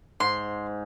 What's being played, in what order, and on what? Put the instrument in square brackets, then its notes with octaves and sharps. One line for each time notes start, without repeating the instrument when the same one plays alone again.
[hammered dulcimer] G#2 [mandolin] C6